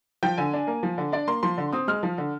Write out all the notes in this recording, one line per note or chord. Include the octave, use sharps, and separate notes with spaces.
F3 G5
D3 G#5
D4
A#3
F3
D3
D4 D5
A#3 C6
F3 C6
D3
C4 D#6
G#3 F6
F3
D3